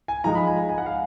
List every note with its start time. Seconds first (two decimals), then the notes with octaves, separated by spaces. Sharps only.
0.08 G#5
0.24 F3 G#3 D#4 A#5
0.35 B5
0.47 G#5
0.69 G#5
0.78 F#5
0.86 F5